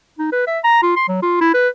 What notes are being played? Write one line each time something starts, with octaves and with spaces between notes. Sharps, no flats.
D#4
B4
E5
A#5
F4
C6
F#3
F4
E4
B4